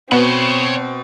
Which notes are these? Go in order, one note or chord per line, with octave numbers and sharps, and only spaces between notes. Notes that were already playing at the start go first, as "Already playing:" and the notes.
B2 B3 C4 C#5 B5